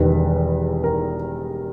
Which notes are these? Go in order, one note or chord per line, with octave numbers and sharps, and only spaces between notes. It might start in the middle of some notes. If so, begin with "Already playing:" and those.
Already playing: E1 E2 D#3 G3 B4
A#4